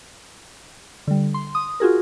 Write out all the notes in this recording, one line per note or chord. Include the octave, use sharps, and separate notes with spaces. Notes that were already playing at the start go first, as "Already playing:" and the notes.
D3 G3
C6
D#6
F4 F#4 G#4 A#4